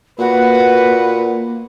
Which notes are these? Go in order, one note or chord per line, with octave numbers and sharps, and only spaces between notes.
A#2 A#3 F#4 B4